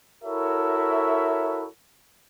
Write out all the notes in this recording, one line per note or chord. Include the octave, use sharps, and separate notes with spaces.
E4 F#4 A4 A#4 C#5 E5